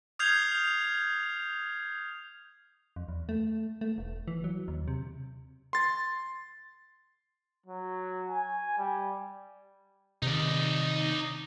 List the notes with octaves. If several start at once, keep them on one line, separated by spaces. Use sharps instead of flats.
D#6 F6 G6 G#6 C7 F7
F2
E2
A3
A3
E1
E3
F#3
D#2
C3
C6 A6
F#3
G#5
G3
C3 D#3 D#4 D5